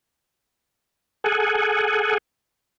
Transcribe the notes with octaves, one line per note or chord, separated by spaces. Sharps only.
G#4 A4 F#5 G#5